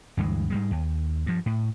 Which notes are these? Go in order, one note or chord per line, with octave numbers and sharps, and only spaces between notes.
D2 G2 E3 G#3
G#2 G3 G#3
D#2
G2 F3
A2